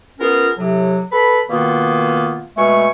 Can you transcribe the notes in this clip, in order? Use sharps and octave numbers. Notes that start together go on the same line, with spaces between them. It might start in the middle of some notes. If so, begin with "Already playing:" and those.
B3 C#4 F4 G#4 A#4
A2 C3 F#3
A4 B4 B5
B2 D#3 A#3 B3 F4
B2 G#3 A3 G#5 C#6